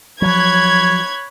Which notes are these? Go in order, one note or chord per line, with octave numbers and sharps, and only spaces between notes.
F3 F#3 C#5 B5 F#6 G#6